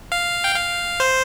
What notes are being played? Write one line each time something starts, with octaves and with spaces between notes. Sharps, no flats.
F5
G5
F5
C5